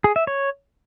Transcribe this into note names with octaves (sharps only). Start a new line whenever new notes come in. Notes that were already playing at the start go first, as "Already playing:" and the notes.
G#4
E5
C#5